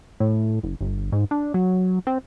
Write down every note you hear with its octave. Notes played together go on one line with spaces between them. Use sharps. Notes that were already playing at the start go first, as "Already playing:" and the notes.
A2
F#1
G1
G#2
D4
F#3
C4